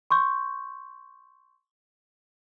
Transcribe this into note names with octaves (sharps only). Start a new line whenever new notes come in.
C6 C#6 G6